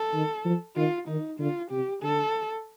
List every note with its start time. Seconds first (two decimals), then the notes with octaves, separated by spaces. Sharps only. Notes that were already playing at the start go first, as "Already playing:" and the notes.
Already playing: A4
0.14 D#3
0.45 F3
0.76 D#3 F4
1.08 D#3 D#4
1.39 D3 F4
1.71 C3 G4
2.02 D3 A4